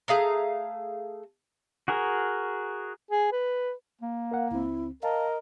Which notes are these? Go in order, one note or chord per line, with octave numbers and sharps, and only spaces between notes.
A3 G#4 F5 A#5
F#4 G#4 A#4
G#4
B4
A#3
A#4 F5 F#5
C#2 C4 E4
A#4 D#5 F5 A5